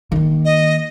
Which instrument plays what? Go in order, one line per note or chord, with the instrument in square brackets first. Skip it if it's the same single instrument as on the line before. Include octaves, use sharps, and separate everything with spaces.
[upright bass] D#3 A#3
[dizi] D#5